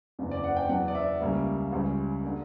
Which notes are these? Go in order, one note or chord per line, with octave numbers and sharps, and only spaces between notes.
F#1 E2 C#3
D5
F#5
G5
E2 B2 F#3 F#5
D5
E5
C#2 C#3 G3 A#3
C#2 C#3 G3
D3 A#3